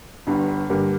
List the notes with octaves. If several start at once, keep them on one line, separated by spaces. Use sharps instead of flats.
G1 G2 D3
G2 D3 G3 A#3